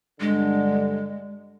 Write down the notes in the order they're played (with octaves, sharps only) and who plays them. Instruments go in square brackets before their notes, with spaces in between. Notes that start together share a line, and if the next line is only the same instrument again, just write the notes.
[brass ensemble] G2 D3 [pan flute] G#3